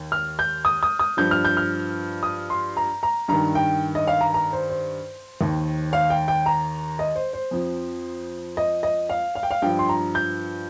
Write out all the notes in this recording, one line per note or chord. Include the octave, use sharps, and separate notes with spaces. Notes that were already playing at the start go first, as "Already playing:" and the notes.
Already playing: D#2 D#3
F6
G6
D#6
D#6
D#6
G2 F3 G6
F6
G6
F6
D#6
C6
A#5
A#5
G2 D#3 A#5
G5
D#5
F5
A#5
A#5
C5
C5
D#2 D#3
F5
G5
G5
A#5
D#5
C5
C5
F2 F3
D#5
D#5
F5
F5
G5
F5
G2 F3 G5
C6
A#5
G6